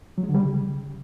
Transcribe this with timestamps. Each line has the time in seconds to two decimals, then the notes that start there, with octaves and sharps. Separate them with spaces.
0.18 F#3
0.23 G#3
0.29 D3
0.35 G3
0.40 C#3